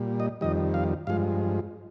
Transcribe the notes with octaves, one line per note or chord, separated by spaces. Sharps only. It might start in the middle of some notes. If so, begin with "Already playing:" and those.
Already playing: A#2 G3
D#5
F2 D#3 G3 D#5
F5
G2 F3 G#3 F5